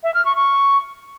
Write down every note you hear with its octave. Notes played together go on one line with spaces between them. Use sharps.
E5
F6
C#6
C#6